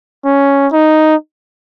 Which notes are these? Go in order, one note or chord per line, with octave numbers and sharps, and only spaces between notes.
C#4
D#4